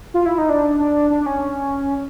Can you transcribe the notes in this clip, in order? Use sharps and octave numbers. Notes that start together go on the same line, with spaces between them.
F4
E4
D#4
D4
D4
D4
D4
C#4